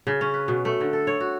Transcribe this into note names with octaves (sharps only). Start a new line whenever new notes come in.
C#3
C#4
B4
B2
A3
D3
A4
C#5
F#4